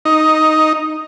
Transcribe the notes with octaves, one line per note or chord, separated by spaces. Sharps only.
D#4